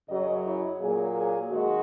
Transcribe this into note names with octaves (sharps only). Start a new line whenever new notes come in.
F#2 C#3 F#3 D#5
E4
A#2 F#3 A#3 G#4
G#4
D#3 G#3 F#4